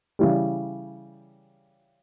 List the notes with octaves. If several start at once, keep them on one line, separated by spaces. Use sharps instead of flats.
C#3 E3 G3